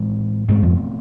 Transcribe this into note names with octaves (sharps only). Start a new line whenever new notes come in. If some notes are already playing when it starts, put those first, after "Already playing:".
Already playing: A2 E3 G#3 C4
G#2 B2 A3 C4
F2